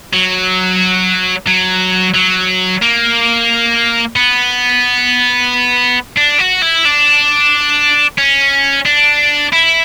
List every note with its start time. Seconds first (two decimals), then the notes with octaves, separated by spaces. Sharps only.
0.13 F#3
1.47 F#3
2.15 F#3
2.82 A#3
4.16 B3
6.17 D4
6.39 F#4
6.62 E4
6.85 D4
8.18 C#4
8.86 D4
9.53 E4